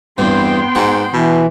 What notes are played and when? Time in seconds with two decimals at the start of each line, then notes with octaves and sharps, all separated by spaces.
0.18 E2 G2 B3 C4 G5 C6
0.75 G#2 F#4
1.13 B2 E3